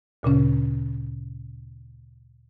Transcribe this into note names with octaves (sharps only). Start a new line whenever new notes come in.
D2 A#2 C#3 C#4